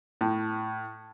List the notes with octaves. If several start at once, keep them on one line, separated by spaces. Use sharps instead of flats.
A2